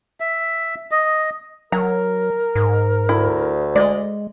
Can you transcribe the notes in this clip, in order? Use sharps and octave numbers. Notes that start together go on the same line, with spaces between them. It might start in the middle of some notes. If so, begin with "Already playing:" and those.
E5
D#5
F#3 A#4 A#5
G#2
D2 E4
G#3 D5 D#5